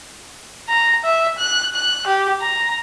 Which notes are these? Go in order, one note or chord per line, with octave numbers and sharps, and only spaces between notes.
A#5
E5
F#6
F#6
G4
A#5